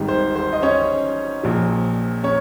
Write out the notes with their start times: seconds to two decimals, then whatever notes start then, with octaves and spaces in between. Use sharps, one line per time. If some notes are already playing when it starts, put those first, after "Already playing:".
Already playing: G#1 G#2 D#3 G3
0.08 C5
0.36 C5
0.53 D#5
0.62 C#4 C#5
1.43 A#1 A#2 F3
2.23 C#4 C#5